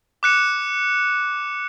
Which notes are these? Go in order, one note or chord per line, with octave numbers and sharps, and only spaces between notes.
D6 F#6 C#7 E7